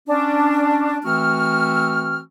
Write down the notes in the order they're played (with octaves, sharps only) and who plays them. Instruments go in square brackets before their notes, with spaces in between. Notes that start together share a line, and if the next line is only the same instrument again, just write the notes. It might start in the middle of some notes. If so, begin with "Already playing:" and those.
[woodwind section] C#4 D4
E3 A3 C4 F#4 F6